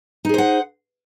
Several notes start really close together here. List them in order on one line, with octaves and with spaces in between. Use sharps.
D#4 G#4 C5 F#5